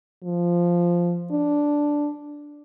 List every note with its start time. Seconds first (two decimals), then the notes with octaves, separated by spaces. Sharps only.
0.24 F3
1.32 D4